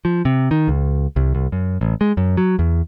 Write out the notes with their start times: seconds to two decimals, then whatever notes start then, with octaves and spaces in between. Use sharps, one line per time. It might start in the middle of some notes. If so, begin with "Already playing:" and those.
0.05 F3
0.25 C3
0.51 D#3
0.68 C#2
1.16 C2
1.35 C2
1.52 F#2
1.81 A1
2.01 G#3
2.17 F#2
2.37 F#3
2.59 E2